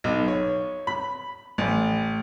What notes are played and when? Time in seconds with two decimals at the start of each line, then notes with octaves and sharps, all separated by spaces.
0.04 B1
0.28 C#5
0.87 B5
1.58 A1